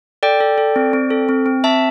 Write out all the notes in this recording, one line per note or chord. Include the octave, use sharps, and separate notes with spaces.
A4 D5 G5
A4
A4
C4
C4
A4
C4
C4
C4 E5 A5